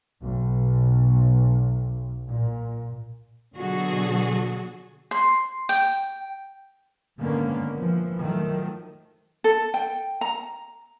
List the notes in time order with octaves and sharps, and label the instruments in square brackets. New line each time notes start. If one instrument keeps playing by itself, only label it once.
[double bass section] B1
A#2
[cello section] B2 D3 F#3 F#4 G#4 A4
[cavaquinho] C6
G5
[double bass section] G#2 D3 D#3 A#3 B3 C#4
E3 F3
D#3 F3 F#3 A3
[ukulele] A4
G5
A#5